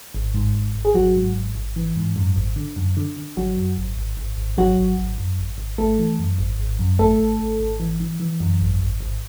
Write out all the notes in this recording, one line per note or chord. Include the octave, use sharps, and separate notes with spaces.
G#1
G#2
G#1
G#1
G#4
G#1 F#3 F#4
G#2
G#1
G#1
E3
G#2
F#2
G#1
D3
F#2
D3
D3
G#1 F#3 F#4
F#2
G#1
G#1
G#1
G#1
G#1 F#3 F#4
G#1
G#1
F#2
G#1
G#1
G#1 A3 A4
E3
F#2
G#1
G#1
F#2
G#1 A3 A4
G#1
G#1
G#1
E3
E3
E3
F#2
G#1
G#1
G#1